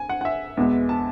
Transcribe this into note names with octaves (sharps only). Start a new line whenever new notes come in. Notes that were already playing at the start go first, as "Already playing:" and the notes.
Already playing: G#5
F#5
F#5
E5
E2 B2 G#3 B3
A5